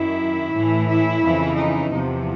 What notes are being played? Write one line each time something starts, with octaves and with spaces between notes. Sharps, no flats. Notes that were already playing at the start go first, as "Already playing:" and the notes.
Already playing: F#2 D#3 E4
A2 E3
E4
F2 C#3 E3
D#4
E2 C3 F3